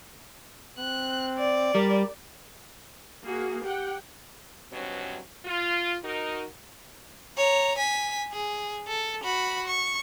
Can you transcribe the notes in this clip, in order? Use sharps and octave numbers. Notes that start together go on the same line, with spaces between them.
C4 F#6
D5
G3 A#4
A#3 F#4 G#4
G4 F#5 G5
G2 B2 E3 F#3 C4 C#4
F4
D#4 F#4 A#4
C#5 A#5
G#5 B6
G#4
A4
F#4 B5
C#6